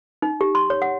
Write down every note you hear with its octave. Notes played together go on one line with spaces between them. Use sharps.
D#4
G4
C6
C#5
F#5